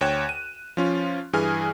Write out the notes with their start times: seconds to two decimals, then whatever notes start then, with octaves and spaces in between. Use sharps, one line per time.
0.01 D2 C#5 G5 F#6 E7
0.29 D#7
0.77 F3 C#4 F4
1.33 G2 E3 G#4 G#5 F6